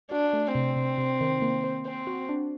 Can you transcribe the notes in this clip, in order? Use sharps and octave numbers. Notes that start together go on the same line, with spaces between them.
D4 F#4
A3
C3 C4
C3
C3
D#3
A#3
C5
C4 C5
F#4
D4